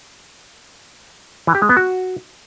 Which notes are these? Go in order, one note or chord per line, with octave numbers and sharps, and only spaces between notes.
E3
G4
G#3
B3
F#4